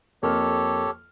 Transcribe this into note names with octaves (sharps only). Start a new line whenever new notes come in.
F2 A#3 G4 A4 C#5 F6